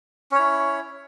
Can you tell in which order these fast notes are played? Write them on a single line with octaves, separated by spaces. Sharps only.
C#4 C#5 E4